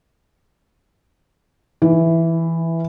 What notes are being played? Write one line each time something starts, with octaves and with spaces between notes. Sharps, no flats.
E3